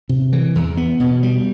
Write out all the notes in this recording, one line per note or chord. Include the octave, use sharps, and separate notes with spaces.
C3
E3
E2
B3
B2
G3